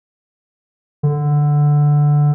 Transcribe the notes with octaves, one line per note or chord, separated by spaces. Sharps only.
D3